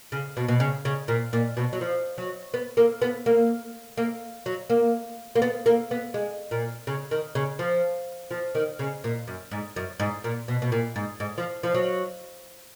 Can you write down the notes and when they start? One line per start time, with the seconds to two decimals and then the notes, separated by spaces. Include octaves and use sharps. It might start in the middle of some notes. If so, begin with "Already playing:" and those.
0.12 C#3
0.37 B2
0.48 B2
0.60 C#3
0.85 C#3
1.08 A#2
1.33 A#2
1.57 B2
1.73 F#3
1.81 F3
2.18 F#3
2.54 B3
2.77 A#3
3.02 B3
3.26 A#3
3.97 A#3
4.46 F#3
4.70 A#3
5.35 A#3
5.42 B3
5.66 A#3
5.91 B3
6.14 G#3
6.51 A#2
6.87 C#3
7.11 D#3
7.35 C#3
7.59 F3
8.31 F3
8.55 D#3
8.79 C#3
9.04 A#2
9.27 F#2
9.51 G#2
9.76 F#2
10.00 G#2
10.24 A#2
10.48 B2
10.62 B2
10.72 A#2
10.96 G#2
11.20 G#2
11.38 F3
11.63 F3
11.74 F#3